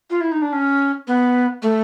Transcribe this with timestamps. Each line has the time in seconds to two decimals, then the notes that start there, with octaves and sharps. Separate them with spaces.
0.10 F4
0.21 E4
0.32 D#4
0.42 D4
0.53 C#4
1.07 B3
1.62 A3